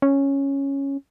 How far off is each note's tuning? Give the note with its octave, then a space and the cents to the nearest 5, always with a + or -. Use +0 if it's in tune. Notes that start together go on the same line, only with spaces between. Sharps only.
C#4 -5